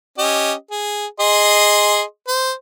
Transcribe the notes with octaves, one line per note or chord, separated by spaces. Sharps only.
C#4 G4 D#5
G#4
G#4 D#5 C6
C5